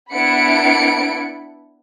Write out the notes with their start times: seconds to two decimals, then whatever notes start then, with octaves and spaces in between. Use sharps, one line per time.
0.13 B3 D4 E4 B5 C#7 D7